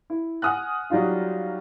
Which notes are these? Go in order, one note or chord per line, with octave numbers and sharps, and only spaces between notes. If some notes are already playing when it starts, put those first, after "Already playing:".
E4
F#5 G#5 D#6 F6 F#6
F#3 G3 D#4 F4 F5